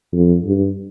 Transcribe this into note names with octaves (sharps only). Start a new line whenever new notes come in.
F2
G2